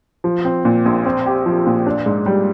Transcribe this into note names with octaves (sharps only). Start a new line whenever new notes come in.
F3
C4
A#2
A#1
C4
G4
F3
A#2
D4
G#2
G3